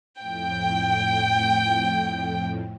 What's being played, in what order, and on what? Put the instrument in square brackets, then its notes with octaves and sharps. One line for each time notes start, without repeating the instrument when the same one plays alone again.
[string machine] F2 A2 [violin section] G5